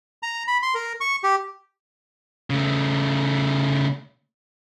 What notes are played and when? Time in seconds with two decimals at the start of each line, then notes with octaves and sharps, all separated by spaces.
0.23 A#5
0.48 B5
0.62 C6
0.74 A#4
1.01 C#6
1.23 G4
2.50 C#3 A3